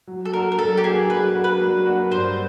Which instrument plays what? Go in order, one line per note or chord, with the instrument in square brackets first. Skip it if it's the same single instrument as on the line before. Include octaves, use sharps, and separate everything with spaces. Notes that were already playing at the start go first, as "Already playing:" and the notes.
[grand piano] F#3
[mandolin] A4
[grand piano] A#3 D4 F#4 [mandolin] A#4
[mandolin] A#4
[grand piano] F#3 [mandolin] A4
[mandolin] G4
[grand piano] A#3 D4 F#4 [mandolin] G#4
[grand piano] F#3 [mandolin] B4
[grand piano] A#3 D4 F#4
[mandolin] B4
[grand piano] F#3
A#3 D4 F#4
[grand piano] G2 [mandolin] C5